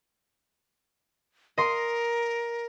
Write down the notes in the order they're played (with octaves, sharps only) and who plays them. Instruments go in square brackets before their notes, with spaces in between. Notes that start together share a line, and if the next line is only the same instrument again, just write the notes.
[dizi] A#4 [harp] D#5 C6